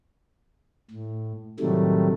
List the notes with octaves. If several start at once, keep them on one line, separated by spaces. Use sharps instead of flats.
A2
A2 C3 D#3 F#3 G3 A3